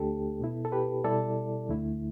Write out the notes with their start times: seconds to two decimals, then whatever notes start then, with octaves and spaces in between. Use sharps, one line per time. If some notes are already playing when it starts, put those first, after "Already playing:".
Already playing: D2 D3 A3 D4 G4 A4
0.40 B2 B3 E4
0.65 A4
0.72 G4 B4
1.04 B2 G3 E4 A4 D5
1.68 D2 D3 A3 E4